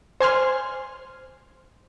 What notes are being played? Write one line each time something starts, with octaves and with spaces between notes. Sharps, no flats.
C5 G#5 C6 F6